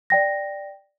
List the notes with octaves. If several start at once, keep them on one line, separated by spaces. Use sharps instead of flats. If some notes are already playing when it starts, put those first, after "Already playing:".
D5 G5 A#6